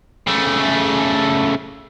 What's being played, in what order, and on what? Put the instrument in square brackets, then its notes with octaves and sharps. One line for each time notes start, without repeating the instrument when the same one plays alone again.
[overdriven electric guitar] C#3 A3